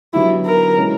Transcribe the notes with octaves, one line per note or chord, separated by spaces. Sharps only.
D3 F#3 B3 D#4 E4 G4
A#4
E3 G#3 C#4 E4